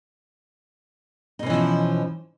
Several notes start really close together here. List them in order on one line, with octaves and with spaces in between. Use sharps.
D#4 B2 C#4 E3 F3